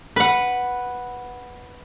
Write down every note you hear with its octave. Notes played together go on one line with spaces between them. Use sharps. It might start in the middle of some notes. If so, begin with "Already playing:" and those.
B4 F#5